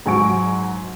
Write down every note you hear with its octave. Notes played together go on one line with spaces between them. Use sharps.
G#2 F#3 G#5 C#6 D7